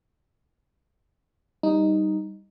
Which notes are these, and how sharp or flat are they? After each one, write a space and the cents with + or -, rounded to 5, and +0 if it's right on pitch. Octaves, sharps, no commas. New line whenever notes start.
G3 +0 D#4 +0